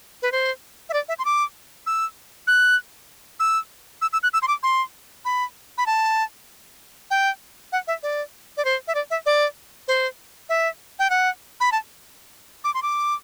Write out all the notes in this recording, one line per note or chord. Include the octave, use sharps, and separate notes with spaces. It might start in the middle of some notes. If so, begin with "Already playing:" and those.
B4
C5
E5
D5
E5
C6
D6
E6
F#6
E6
E6
E6
F#6
E6
C6
D6
C6
B5
B5
A5
G5
F#5
E5
D5
D5
C5
E5
D5
E5
D5
C5
E5
G5
F#5
B5
A5
D6
C6
D6